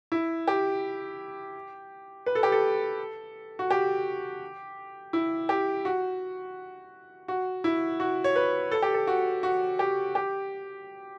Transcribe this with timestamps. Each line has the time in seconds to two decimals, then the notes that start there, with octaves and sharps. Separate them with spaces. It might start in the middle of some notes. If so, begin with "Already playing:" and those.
0.12 E4
0.48 G4
2.26 B4
2.35 A4
2.43 G4
2.52 A4
3.59 F#4
3.71 G4
5.13 E4
5.49 G4
5.85 F#4
7.28 F#4
7.64 E4
8.00 F#4
8.24 C#5
8.36 B4
8.72 A4
8.82 G4
8.94 A4
9.07 F#4
9.43 F#4
9.79 G4
10.15 G4